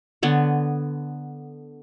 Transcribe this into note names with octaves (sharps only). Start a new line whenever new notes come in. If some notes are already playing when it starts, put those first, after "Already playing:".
D3 B3 C#5